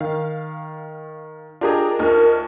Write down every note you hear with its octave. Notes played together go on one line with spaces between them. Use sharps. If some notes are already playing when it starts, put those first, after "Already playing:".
D#3 F5
D4 F4 G4 G#4 A#4 D#5
D2 D#4 F4 A#4 F6